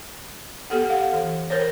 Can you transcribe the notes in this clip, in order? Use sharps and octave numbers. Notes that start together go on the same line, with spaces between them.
B3 G4 A4 F#5
F5 F#5
E3 A4
A#4 C5 C#5